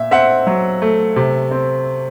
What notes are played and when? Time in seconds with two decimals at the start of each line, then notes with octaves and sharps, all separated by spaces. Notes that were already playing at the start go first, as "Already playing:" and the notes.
Already playing: A#2 E5
0.11 C4 E5 F#5
0.47 F#3
0.82 A3
1.16 C3
1.51 C4